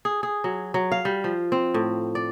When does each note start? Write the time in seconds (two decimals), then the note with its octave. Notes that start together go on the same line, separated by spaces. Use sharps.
0.05 G#4
0.23 G#4
0.44 F#3
0.74 F#3
0.92 F5
1.05 G3
1.24 F3
1.52 C4
1.74 A2
2.15 D5